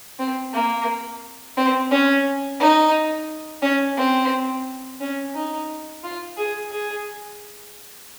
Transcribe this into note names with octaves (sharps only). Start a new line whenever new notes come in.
C4
A#3
C4
C#4
D#4
C#4
C4
C#4
D#4
F4
G#4
G#4